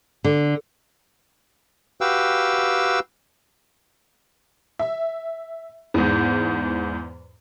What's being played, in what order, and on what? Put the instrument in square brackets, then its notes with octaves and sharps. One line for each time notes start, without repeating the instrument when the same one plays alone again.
[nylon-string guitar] D3
[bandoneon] F#4 G4 B4 F5 G5 E6
[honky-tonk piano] E5
E2 G#2